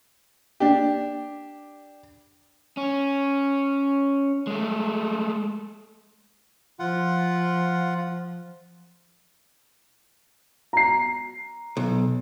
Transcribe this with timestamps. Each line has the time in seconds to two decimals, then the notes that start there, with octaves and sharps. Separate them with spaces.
0.60 D4 G4
2.77 C#4
4.47 G#3 A3
6.79 F3 F4 F#5
10.73 A#5 C7
11.77 B1